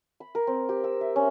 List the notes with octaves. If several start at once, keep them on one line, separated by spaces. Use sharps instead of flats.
B5
A#4
C4
G4
E6
E5
C#4